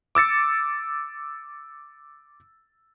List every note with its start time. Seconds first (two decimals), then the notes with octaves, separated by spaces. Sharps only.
0.15 D6 E6 A6 C#7